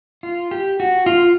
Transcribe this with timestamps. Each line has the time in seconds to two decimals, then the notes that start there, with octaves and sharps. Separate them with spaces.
0.23 F4
0.51 G4
0.80 F#4
1.06 F4